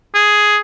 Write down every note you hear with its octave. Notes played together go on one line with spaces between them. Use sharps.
G#4